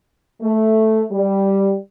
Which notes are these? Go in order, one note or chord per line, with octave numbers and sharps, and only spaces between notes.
A3
G3